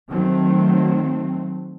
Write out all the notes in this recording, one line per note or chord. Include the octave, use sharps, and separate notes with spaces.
D#3 F#3 A3 C4